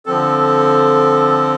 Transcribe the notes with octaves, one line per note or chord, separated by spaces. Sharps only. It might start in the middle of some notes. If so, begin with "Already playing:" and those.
D3 F3 C4 A4